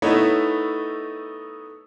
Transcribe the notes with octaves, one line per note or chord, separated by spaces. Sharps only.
A3 B3 D#4 E4 C#5